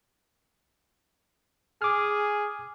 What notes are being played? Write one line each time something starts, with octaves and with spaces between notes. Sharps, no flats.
G#4 D6 F6